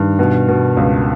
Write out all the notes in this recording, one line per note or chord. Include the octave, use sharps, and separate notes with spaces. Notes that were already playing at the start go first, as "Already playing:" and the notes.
Already playing: G2 D#3
B2
B2
C#2